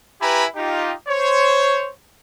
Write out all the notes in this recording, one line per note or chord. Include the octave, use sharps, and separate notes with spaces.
E4 G4 B4 G#5 A#5 B5
D#4 F4 G4
C5 C#5